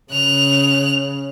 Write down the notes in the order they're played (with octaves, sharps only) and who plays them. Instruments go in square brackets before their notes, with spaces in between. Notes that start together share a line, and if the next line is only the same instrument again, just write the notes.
[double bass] C#3 [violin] F#6 F7